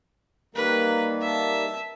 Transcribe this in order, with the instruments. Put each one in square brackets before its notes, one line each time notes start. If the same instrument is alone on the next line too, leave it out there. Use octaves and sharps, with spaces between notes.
[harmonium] D#3 G3 A#3 [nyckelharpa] A#4 B4
[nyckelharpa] E5 A5